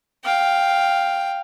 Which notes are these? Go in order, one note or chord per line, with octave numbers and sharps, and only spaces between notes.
F5 G5